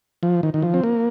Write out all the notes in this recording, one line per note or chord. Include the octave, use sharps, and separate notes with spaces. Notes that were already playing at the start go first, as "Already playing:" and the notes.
F3
D#3
D#3
F3
C4
A#3